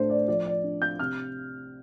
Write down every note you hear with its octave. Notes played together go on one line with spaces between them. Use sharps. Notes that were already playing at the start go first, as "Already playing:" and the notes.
Already playing: A2 A3 D4 C5
D5
F3 D5
D5
D4
G6
C3 F6